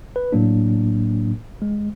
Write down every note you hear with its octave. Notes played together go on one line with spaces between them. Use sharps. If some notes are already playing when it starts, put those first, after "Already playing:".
B4
A2 F#3 A#3 D4
G#3